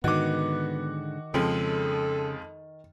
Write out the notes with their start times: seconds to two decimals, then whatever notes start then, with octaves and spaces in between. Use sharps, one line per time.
0.04 G#2 D3 D#3 B3 F#4 D6
1.34 F2 C#3 F3 G#3 A4